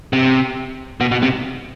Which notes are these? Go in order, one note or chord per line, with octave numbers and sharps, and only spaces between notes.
C3
B2
B2
C3